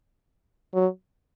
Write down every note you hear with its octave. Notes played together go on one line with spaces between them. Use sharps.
F#3